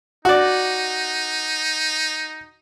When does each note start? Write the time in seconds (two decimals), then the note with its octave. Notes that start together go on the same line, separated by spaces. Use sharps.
0.25 D#4 F#4 D5